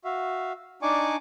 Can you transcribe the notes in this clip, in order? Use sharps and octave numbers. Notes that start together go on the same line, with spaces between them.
F#4 E5 F5
D4 D#4 D5 G#5 C#6 D6